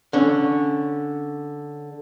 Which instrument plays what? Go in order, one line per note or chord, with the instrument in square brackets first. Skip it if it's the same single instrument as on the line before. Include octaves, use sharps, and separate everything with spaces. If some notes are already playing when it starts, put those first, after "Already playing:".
[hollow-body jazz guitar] D3 C#4